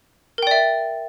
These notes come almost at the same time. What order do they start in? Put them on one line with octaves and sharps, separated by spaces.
A#4 G5 D5 E5